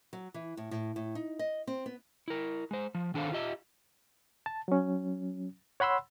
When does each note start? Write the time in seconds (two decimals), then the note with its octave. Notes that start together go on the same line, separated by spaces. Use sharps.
0.13 F#3
0.34 E3
0.57 A2
0.71 A2
0.96 A2
1.15 D#4
1.39 D#5
1.67 C4
1.86 B3
2.28 E4 A#4
2.71 G#3 C5
2.95 F3
3.14 D#3 D4 A4 C5 F5
3.32 F4 G4 D#5 E5
4.46 A5
4.68 F#3 C#4
5.80 C#5 F#5 B5 C6 E6